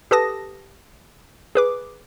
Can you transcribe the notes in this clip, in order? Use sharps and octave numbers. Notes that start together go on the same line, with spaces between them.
G4 A4 B4 A5 D#6 A#6
G#4 B4 D6